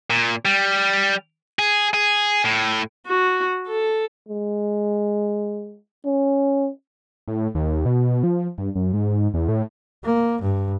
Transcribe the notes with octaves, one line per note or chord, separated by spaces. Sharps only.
A#2
G3
G#4
G#4
A2
F#4
A4
G#3
C#4
A2
D#2
B2
F3
G2
F#2
G#2
E2
A2
A#3
G2